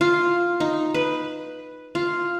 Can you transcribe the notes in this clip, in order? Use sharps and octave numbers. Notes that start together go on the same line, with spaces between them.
F4
D#4
B4
F4